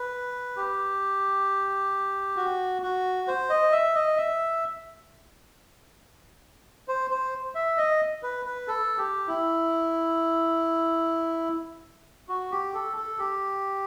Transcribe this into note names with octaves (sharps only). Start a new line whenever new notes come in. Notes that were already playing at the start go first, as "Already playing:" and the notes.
Already playing: B4
G4
F#4
F#4
C5
D#5
E5
D#5
E5
C5
C5
E5
D#5
B4
B4
A4
G4
E4
F#4
G4
A4
A4
G4